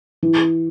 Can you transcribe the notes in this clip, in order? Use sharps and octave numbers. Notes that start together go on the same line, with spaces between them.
E3